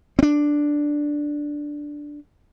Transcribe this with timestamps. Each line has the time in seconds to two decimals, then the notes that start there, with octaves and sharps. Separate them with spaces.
0.19 C4 D4